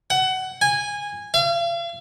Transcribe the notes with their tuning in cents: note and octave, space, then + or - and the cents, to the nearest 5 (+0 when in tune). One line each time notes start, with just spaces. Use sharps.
F#5 +20
G#5 -15
F5 -40